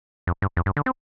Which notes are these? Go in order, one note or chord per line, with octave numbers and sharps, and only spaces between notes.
F2
G2
F2
G2
D3
C4